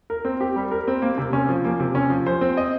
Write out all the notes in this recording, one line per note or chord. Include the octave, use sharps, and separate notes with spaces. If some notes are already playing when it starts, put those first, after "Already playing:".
A#4
C4
G4
G3
A#4
C4
A#3
C3
C#4
F3
A#3
C3
C#4
F3
C5
C4
D#5